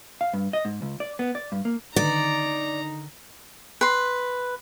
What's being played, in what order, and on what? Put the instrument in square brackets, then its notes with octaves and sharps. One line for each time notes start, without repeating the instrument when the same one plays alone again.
[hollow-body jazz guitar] F5
G2
D#5
G#2
C#2
D5
B3
D5
G2
A#3
[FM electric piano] D3 D#3 [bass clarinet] D#4 [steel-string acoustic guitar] D5 [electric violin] A#5
[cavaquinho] B4 C6